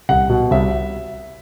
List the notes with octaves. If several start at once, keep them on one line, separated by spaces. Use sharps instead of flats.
C2 F#5
B2
C2 E5